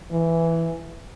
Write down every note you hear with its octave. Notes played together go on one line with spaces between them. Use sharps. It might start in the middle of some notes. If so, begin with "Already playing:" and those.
E3